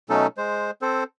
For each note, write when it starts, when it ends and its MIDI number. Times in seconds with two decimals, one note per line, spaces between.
0.10 0.27 47
0.10 0.27 54
0.10 0.27 57
0.10 0.27 61
0.10 0.27 63
0.10 0.27 69
0.38 0.71 56
0.38 0.71 72
0.82 1.04 60
0.82 1.04 69
0.82 1.04 72